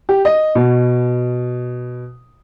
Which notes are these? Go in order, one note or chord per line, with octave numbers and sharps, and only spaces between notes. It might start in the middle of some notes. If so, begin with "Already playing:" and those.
G4
D#5
B2